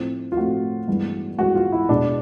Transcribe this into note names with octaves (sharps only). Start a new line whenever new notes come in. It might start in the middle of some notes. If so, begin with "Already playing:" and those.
Already playing: A2 F3 A3 C4
F4
A2 F3 A3 C4 F#4
G2 E3 G#3 B3
G2 E3 G#3 B3 F#4
F4
E4
E2 B2 G#3 D4